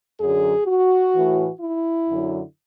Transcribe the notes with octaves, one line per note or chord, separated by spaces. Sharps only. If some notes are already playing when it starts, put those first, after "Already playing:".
F#2 D3 F#3 G#4
F#4
A2 E3
E4
F#2 D3 F#3